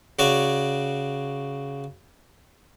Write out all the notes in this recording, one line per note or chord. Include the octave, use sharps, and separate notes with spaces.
C#3 F#4 C#5 D5